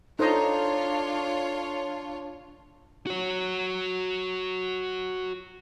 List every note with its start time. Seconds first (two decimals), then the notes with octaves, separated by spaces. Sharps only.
0.19 D4 D#4 F4 A4 C5 C#5 D#5
3.07 F#4 C#5